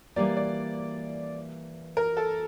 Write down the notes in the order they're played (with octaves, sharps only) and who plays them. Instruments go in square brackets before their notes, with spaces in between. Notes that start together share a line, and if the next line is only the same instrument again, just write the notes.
[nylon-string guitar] E3 G3 A#3 [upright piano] D5
[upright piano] D5
A#4
A4